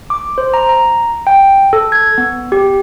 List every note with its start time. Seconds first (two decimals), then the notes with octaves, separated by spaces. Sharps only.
0.10 D6
0.38 C5
0.54 A#5
0.69 A#5
1.27 G5
1.73 A4
1.92 G#6
2.18 B3
2.52 G4